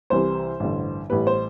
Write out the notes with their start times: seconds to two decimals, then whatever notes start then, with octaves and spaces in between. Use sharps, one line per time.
0.10 C2 C3 E3 G3 C5
0.60 A1 G2 D3
1.10 A1 A2 G3 B4
1.27 C5